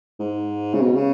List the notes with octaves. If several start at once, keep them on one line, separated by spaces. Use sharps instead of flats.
G#2
C#3
B2
C#3